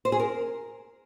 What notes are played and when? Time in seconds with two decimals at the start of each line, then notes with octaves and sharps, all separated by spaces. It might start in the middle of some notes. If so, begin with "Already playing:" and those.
0.05 C5
0.12 G#4
0.19 A#4